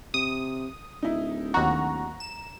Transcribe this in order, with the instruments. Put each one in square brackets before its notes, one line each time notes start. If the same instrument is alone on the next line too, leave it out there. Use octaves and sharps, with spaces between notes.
[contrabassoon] C3 [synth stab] D#6
[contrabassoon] D1 [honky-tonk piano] D#4 E4
[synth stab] D#2 F#4 [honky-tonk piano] A#5
[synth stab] E7